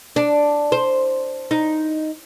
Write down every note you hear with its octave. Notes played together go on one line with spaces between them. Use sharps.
D4
C5
D#4